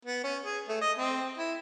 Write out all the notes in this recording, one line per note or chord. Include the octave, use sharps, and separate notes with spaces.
B3
C#4
G#4
A3
D#5
C4
E4